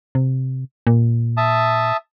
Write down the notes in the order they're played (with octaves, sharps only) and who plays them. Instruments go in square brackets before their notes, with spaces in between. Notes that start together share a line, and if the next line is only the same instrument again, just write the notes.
[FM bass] C3
A#2
[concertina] E5 A5 D#6